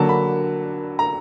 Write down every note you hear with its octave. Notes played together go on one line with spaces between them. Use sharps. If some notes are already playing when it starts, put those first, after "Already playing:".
Already playing: D3 F#3 A#3 A5
B5
A#5